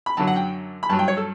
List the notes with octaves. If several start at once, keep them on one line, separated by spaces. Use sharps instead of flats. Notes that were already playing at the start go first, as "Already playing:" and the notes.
B5
F#2 D3 F#3 A5
F#5
G5
B5
G2 F#3 A5
G5
C#5
A4